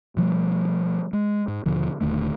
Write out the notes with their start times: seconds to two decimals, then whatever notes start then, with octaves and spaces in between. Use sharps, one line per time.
0.17 B2 F3 G3 A3
1.13 G#3
1.48 G#2
1.66 D#2 B2 D3 F3
2.01 D#1 D#2 D3 A3